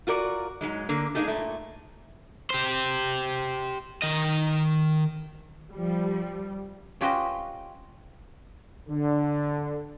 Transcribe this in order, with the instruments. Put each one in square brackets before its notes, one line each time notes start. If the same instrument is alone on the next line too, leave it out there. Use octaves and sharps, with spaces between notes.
[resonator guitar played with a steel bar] F4 F#4 A#4 D5
G#2 F#3 G#3
D3 A#3
G#3 A#3 D4 D#4 G4 A4
A#2 A3
[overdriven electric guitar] G4 C5
D#3 D#5
[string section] F3 G3
[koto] C#4 F4 G4 B4 C5 D#5
[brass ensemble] D3